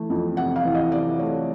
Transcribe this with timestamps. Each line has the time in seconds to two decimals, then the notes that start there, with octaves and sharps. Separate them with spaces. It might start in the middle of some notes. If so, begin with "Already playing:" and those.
Already playing: E3 A3
0.10 F2
0.37 C3 F#5
0.56 F5
0.65 E3
0.75 D#5
0.92 C3 D5
1.19 A3 C#5